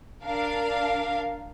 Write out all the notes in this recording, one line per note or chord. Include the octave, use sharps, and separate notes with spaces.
D4 A#4 F5